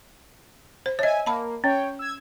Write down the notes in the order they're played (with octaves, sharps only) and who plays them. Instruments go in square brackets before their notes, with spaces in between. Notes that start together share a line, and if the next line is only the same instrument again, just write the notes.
[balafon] C5
[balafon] C#5 D#5 [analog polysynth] E5 G#5
[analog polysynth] A#3 [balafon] A5 B5
[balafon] C#4 [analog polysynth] C#5 G5
[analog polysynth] E6 G#6